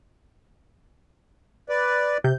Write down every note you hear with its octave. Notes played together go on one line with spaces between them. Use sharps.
B4 D5
C3 G6